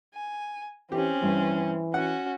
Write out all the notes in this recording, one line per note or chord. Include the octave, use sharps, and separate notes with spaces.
G#5
E3 C4 C#4 G4
G2 E3
C#4 F#4 F#5